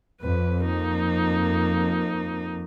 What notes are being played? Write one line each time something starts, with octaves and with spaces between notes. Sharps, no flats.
F2 B4
A#3 D#4